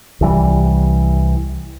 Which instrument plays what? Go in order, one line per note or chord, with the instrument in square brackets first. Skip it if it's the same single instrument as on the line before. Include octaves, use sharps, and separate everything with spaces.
[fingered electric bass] C2 E3 G3